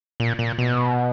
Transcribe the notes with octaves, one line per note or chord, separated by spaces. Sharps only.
A#2
A#2
B2